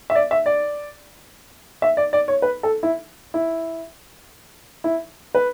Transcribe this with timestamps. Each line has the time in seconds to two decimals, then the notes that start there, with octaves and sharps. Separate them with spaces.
0.10 E5
0.15 D5
0.31 E5
0.46 D5
1.82 E5
1.97 D5
2.13 D5
2.28 C#5
2.42 B4
2.63 A4
2.83 E4
3.34 E4
4.84 E4
5.35 B4